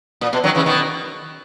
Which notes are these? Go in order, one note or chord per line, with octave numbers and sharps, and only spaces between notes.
A#2
B2
D#3 F#3
C#3 E3
B2 D#3